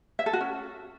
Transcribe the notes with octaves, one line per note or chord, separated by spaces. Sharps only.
E5
A4
F#4
C#4